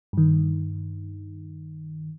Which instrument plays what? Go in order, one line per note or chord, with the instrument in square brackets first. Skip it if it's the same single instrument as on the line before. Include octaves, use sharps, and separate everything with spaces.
[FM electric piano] G2 D#3